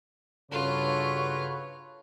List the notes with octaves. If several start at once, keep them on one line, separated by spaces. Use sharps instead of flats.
G2 C#3 F4 F#4 A4 B4 C#5